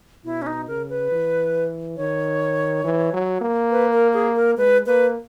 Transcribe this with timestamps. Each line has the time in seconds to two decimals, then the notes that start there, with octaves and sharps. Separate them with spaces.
0.25 B2 E4
0.42 C#4
0.47 D#4
0.67 C#3 A#4
0.89 B4
1.12 E3
1.97 D#3 C#5
2.84 E3
3.14 F#3
3.41 A#3
3.71 B4
3.93 A#4
4.13 G#4
4.36 A#4
4.57 G#3 B4
4.86 A#3 B4